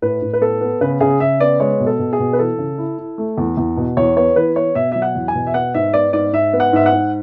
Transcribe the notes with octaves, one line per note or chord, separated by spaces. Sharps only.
A2 B4
A2
B4
B3 A4
B3
C#3 B4
C#3 G#4
C#3 E5
B3 D5
G#3 C#5
B2
A4
B2
G#4
B2
B4
E3 A4
C#3
E4
E4
A3
E2
E2
B2
E2 C#5
B3 C#5
E3 B4
B3 C#5
B2 E5
F#3 E5
F#5
E2
G#5
B2
E5
B3 F#5
G#2 E5
B3 D5
G#2 D5
G#2 E5
B3
F#5
G#2 E5
F#5
G#2